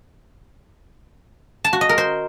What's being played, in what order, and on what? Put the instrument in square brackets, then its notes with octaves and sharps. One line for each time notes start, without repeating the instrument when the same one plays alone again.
[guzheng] A5
F#4
D#5
A#4
C5